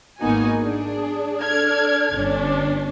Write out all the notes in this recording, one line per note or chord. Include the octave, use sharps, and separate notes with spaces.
G#1 A#3 B3 D#4 F#4 G#5
D4 G#4
D4 A4 F6 G#6
G1 C#4 D4